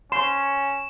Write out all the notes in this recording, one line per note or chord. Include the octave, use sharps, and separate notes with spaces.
C#4 C6 E7